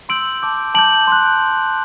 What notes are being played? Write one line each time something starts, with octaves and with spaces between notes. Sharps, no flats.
C6 E6 G6 D7 F#7
A5 D6 G6
A5 D6 G6 D7 F#7
C6 F#6